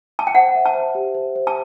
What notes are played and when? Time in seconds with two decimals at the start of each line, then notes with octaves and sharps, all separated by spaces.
0.19 A5
0.27 G5
0.35 C5 F#5
0.55 E5
0.65 A5
0.75 C5
0.95 G4
1.15 C5
1.36 C5
1.47 A5